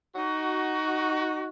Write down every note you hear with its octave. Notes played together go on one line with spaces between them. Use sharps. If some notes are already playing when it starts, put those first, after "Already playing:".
D#4 F#4